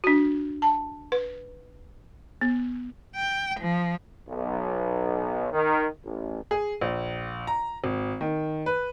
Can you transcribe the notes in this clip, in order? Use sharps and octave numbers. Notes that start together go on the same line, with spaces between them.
D4 F#4
A5
B4
B3
G5
F3
B1
D#3
A1
G#4
A#1
A#5
G#1
D#3
B4